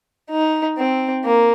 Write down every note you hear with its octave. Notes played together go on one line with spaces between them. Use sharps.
D#4
C4
A#3